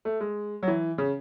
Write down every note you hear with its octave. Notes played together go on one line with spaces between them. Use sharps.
A3
G#3
F#3
E3
C#3